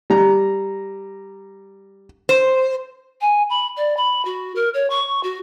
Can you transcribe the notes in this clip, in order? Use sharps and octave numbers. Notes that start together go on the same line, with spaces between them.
G3 A#5
C5
G#5
B5
D5
B5
F#4
A#4
C#5
C#6
F#4